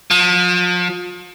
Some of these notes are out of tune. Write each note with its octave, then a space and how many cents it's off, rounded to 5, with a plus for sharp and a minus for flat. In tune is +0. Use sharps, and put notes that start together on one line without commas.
F3 +35